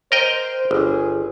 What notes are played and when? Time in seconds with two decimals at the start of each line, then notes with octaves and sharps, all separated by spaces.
0.12 A#4 C5 D#5 G5
0.71 G1 G#4